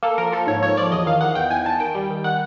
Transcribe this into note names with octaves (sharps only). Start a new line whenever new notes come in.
A#3 A4
F3 A#4
F3 A4
G#2 C#5
F3 C#5
F3 D5
E2 D#5
D#3 F5
D#3 F#5
E2 G5
E2 G#5
E2 A5
D#3 G5
G3
D#3
D#3 F#5